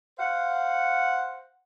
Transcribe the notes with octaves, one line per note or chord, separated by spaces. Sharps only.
C5 F5 F#5